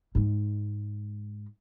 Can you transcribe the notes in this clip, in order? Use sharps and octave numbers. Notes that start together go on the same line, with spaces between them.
G#2 G#3